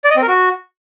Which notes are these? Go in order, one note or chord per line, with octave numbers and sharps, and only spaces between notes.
D5
D#5
C4
A#4
F#4